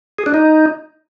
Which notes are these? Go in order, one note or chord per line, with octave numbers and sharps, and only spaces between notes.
G#4
D4
D#4